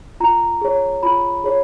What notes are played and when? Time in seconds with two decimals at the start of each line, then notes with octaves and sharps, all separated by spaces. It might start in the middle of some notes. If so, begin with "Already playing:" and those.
0.20 F4 A#5
0.61 G#4 C#5
1.03 F4 B5
1.44 G#4 C#5